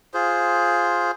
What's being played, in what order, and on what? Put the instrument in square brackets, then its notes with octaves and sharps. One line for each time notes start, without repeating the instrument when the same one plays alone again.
[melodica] F4 G#4 C5